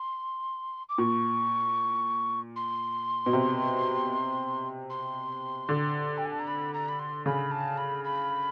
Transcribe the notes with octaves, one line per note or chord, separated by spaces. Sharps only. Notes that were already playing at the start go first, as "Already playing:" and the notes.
Already playing: C6
D6
A#2 C#6
C6
B2
C3
C6
D3
G5
G#5
A5
A#5
B5
A#5
B5
C6
C#3 B5
A5
B5
B5